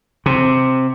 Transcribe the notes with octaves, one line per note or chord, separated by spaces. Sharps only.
C3